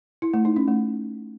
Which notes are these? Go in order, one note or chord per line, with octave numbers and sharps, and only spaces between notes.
E4
A3
D#4
C#4
A3